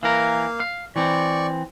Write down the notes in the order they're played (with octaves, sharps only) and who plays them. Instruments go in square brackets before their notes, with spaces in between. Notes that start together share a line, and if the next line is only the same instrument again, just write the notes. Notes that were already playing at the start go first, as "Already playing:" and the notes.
[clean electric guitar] E3 A#4 [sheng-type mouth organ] A#3 F5
[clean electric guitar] F5
[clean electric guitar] E3 C4 [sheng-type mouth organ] D5 C#6